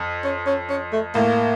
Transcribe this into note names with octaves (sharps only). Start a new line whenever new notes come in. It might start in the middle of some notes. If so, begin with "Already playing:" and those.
Already playing: F2
C#4
C#4
C#4
A3
A2 A#3